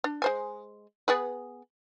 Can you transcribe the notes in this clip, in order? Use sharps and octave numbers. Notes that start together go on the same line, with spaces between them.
D4
G#3 C5 G#5
B3 G#4 B4